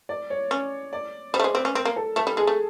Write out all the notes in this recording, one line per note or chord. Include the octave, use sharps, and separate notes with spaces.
D5
C#5
C#4
D5
G3 C5
A3
G#3 C5
C4 B4
C#4
C4 A#4
A#3
A4
A3 A4
G3
G#3 G#4
A3